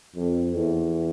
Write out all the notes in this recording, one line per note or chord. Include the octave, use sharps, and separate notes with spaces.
F2
E2